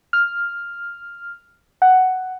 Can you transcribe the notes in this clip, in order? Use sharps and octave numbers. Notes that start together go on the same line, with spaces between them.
F6
F#5